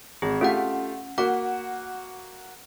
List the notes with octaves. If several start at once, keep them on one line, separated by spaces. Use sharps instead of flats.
G#1 G#4
A3 C#4 F4 G4 F#5
A#3 F#4 F#5 D6